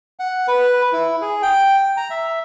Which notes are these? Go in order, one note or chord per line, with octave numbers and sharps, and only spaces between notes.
F#5
B4
E4
G#4
G5
A#5
E5